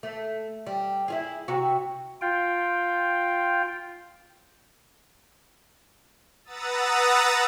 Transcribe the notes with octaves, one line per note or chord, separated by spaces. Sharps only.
A3
G3
E4 F4 G#4
C3 F#4
F4 G5
B4 F#5 A#5 D#6 E6 A6